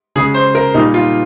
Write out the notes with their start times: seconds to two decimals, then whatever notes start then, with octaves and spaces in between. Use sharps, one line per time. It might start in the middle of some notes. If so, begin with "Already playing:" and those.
0.16 C#3 G#4
0.19 G#3
0.34 C5
0.55 A#4
0.74 A#2 G3 A#3 D#4
0.94 F4